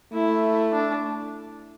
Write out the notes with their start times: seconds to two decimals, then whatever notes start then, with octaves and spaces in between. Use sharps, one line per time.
0.12 A3 E4
0.72 D4